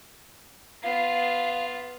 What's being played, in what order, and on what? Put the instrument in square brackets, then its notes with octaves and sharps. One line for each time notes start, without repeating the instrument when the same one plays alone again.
[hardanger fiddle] B3 F4 [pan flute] F5